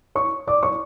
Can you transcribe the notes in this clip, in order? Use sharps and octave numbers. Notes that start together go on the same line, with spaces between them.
C#5 C#6
D5 D6
C#5 C#6